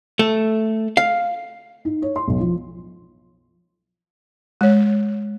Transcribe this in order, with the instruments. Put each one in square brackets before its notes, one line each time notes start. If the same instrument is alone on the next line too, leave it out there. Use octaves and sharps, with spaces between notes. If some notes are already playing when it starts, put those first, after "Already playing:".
[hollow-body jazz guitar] A3
F5
[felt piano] D#4
C#5
C6
B1
F3
[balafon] G#3 C#5